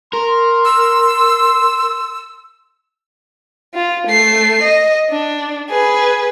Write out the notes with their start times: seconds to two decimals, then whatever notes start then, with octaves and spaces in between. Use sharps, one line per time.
0.13 A#4 C6
0.65 E6
3.74 F4
4.07 A3 C7
4.62 D#5
5.10 D4
5.70 G#4 B4